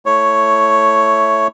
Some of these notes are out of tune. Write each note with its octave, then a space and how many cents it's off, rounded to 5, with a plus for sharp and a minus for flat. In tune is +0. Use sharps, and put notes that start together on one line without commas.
A3 +0 E4 +0 C#5 +0